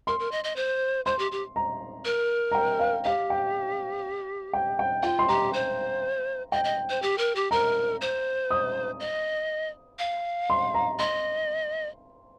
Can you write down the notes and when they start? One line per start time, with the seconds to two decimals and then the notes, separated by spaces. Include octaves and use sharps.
0.07 A#4 C6
0.20 A#4
0.32 D#5
0.44 D#5
0.56 C5
1.06 C5 C6
1.19 G4
1.32 G4
1.56 A#5
2.05 A#4
2.52 A#5
2.55 G5
2.79 F5
3.04 G4 F5
3.30 G5
4.53 G5
4.79 G5
5.03 F4 G5
5.19 C6
5.29 G4 A#5
5.53 C5
6.52 D#5 G5
6.64 D#5
6.90 C5
7.02 G4
7.18 A#4
7.36 G4
7.51 A#4 A#5
8.01 C5
8.51 D#6
9.00 D#5
9.99 F5
10.50 C6
10.74 A#5
10.99 D#5 C6